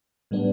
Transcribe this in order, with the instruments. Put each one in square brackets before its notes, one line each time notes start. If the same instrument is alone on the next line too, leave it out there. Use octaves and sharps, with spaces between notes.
[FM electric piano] A2 G3 B3 D4